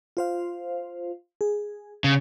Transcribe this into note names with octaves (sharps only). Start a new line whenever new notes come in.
F4 C5 F5
G#4
C#3